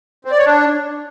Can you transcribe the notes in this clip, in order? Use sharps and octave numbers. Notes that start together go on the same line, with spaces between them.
C4
D5
C#5
D4